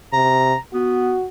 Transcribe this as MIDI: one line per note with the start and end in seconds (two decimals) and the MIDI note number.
0.13 0.54 48
0.13 0.57 82
0.74 1.14 59
0.74 1.28 66